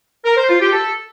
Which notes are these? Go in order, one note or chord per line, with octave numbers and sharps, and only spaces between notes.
A#4
C5
F4
G4
A4